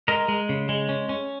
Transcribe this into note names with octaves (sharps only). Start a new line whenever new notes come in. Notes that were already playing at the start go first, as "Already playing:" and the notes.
G#3 A#4 D#5
G#3
C#3
G#3
C#4
C#4